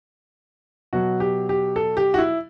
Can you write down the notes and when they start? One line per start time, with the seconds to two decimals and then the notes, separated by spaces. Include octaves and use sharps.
0.93 B2 F#3 F#4
1.20 G4
1.49 G4
1.76 A4
1.97 G4
2.14 F#4
2.18 E4